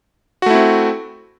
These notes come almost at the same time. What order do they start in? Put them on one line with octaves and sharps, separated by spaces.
F#4 A3 E4 C4